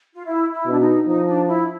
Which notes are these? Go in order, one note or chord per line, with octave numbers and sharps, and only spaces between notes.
F4
E4
E4
B2 D4
D#4
F3 D#4
D4
E4